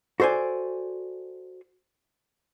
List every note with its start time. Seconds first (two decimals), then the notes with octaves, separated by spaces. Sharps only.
0.20 F#4 A4 C5 D5 G#5